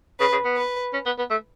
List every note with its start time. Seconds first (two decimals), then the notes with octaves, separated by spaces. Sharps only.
0.19 C#3 B4
0.32 C#3
0.45 B3
0.57 B4
0.93 C#4
1.06 B3
1.18 B3
1.30 A3